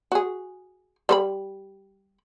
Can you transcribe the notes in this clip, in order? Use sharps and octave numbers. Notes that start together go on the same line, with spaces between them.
F#4 G#4
G3 C5 B5